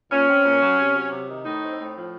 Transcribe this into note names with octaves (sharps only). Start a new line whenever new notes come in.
A#2 C#4
C4
A#2
F#3
C3
F#3
C3
D#3
A2 D#4
C4
A2
F3